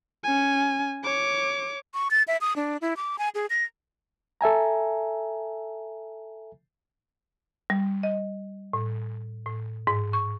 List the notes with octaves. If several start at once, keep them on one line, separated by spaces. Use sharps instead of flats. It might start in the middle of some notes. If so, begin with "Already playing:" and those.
C#4 G#5
C#5 D6
C#6
A6
E5
D#6
D4
E4
D6
G#5
G#4
A#6
A4 E5 G#5 A#5
G3
D#5
A2
A2
G#2
C#6